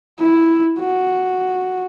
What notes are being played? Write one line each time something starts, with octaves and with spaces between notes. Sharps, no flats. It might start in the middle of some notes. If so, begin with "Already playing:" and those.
E4
F#4